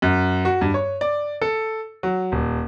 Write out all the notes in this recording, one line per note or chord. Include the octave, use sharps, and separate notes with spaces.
F#2
F#4
G2
C#5
D5
A4
F#3
D#1